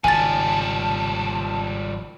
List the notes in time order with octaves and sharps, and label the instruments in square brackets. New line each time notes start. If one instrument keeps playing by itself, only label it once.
[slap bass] G#1 G#2 C#3 [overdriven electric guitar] F3 G3 [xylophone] G#5 A6 [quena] A5